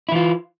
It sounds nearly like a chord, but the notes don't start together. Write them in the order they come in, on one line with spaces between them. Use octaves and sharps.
E4 E3 F4